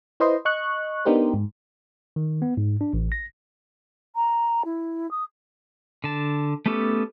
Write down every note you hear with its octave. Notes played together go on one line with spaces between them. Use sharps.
E4 B4 C5 D#5 C6
D#5 C#6 F#6
B3 D4 D#4 G4 A#4 C5
G#2
D#3
B3
G#2
D4
A1
A#6
A#5
E4
D#6
D3 A5
A3 B3 C#4 G4 A4